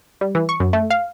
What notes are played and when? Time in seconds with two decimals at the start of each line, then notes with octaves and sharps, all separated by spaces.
0.21 G3
0.35 E3
0.49 C#6
0.60 F#2
0.73 A3
0.90 F5